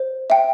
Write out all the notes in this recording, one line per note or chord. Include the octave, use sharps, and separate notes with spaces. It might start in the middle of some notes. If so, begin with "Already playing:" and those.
Already playing: C5
E5 G5